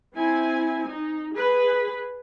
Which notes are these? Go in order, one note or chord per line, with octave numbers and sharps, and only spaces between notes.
C4 E4 G#5
D#4
G#4 B4